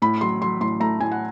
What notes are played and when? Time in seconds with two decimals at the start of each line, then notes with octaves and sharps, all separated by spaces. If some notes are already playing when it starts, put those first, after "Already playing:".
0.02 A2 B5
0.21 F#3 C6
0.42 F#3 C6
0.61 A2 C6
0.80 A3 A#5
1.00 A2 G#5
1.12 F#5